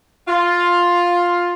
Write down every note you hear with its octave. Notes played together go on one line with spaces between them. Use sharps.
F4